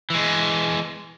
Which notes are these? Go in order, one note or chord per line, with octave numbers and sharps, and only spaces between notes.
E3 G#3